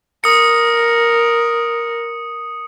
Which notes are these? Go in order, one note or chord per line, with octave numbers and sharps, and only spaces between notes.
A#4 D#6 C#7